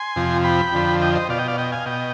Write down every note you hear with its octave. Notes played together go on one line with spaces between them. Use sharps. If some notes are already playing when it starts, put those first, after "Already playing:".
Already playing: G#5 C6
F2 C3 F3
G5 B5
F2 D3 F3
D#5 G5
C5 D#5
B2 D5 F5
D#5 G5
D5 F5
D#5 G5
F5 G#5
B2 D#5 G5